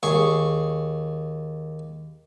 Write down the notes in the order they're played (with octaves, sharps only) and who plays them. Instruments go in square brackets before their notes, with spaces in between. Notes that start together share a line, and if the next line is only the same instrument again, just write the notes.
[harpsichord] D#2 G#4 C#6